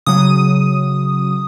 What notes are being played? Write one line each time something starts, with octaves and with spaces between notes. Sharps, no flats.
C#3 F#3 D#6